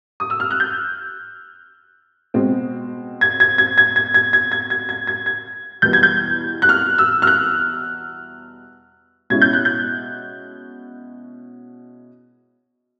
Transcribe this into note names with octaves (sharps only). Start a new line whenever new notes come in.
D#6
E6
F6
F#6
G6
B2 G#3 C4
G#6
G#6
G#6
G#6
G#6
G#6
G#6
G#6
G#6
G#6
G#6
G#6
E2 B2 G3 B3 G6
G#6
G6
F#6
F6
E6
F6
F#6
B2 G#3 C#4 E4 G#6
G6
F#6
G6